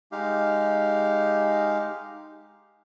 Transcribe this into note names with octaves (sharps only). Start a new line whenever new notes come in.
G#3 D#4 G4 F5